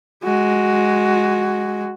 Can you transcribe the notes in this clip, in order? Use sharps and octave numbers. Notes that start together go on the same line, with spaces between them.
G#3 F#4